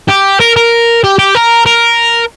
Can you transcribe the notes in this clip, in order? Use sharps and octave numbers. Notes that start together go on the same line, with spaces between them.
G4
A#4
A#4
G4
G4
A#4
A#4